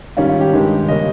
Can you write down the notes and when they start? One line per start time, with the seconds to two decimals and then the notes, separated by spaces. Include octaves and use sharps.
0.17 G#2 D#3 G3 C#4 F4
0.29 F4
0.41 G4
0.53 G2 D#3 G#3
0.88 C#3 G3 A#3 C#4 D#5